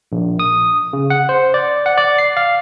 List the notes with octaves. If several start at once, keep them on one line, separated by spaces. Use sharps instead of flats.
A#1
D#6
C#3
F#5
C5
D5
F#5
D5
C7
F5